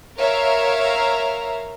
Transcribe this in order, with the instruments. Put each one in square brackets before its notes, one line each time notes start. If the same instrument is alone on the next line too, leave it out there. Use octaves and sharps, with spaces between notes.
[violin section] A#4 C#5 E5 F5 A#5